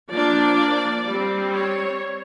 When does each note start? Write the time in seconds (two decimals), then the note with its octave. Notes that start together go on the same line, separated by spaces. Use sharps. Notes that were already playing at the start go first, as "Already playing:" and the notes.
0.11 F3 A#3 D4 D5
1.07 G3 C4
1.54 C#5